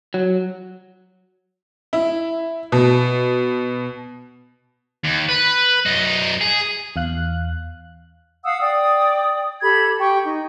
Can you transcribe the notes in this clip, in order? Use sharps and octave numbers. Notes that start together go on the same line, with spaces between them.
F#3
E4
B2
D#2
B4
F#2 D#4
G#4
E2 F5 F#6
F5 F#5 D#6 E6
D5 G5 D#6
G4 A4 B5 G#6
G4 G5 C#6
D#4